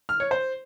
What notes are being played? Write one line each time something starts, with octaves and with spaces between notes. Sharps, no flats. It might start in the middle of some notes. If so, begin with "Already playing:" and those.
F6
C#5
C5